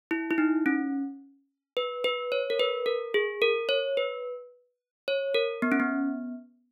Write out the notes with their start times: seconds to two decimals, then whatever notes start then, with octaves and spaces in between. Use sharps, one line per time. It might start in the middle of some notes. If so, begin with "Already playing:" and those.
0.11 E4
0.31 E4
0.38 D#4
0.66 C#4
1.77 B4
2.04 B4
2.32 C#5
2.50 A#4
2.60 B4
2.86 A#4
3.14 G#4
3.42 A#4
3.69 C#5
3.97 B4
5.08 C#5
5.34 A#4
5.62 B3
5.72 C#4
5.80 B3